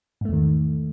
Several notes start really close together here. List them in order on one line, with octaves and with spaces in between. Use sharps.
G#2 A3 E2 D#3